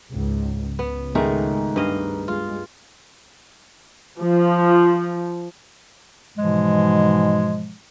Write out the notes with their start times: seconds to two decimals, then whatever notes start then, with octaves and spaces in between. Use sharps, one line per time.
0.13 C#2 G#2
0.79 C#2 B3
1.15 G#2 D#3 G#3 A3
1.76 G2 D#5 F5
2.28 G#3 F4
4.19 F3
6.36 G#2 B2 E3 F3 G#3